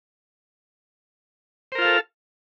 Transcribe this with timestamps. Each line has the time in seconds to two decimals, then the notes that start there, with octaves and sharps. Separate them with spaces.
1.72 C5
1.75 A#4
1.78 F4
1.82 F5
1.85 A4